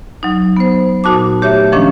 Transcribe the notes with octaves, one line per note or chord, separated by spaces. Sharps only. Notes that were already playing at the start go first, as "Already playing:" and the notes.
F#3 D#4
B3 C5
A#2 D#4 F#4 A5 D6
A3 G4 C#5 E5
D#3 F3 A#3 C#4 D4